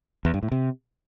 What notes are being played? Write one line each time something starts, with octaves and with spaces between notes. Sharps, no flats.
E2
G2
A2
C3